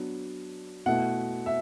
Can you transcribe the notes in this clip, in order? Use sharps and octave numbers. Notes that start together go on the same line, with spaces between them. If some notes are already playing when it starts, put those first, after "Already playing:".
Already playing: F#3 B3 D4
B2 A3 E4 F#5
E5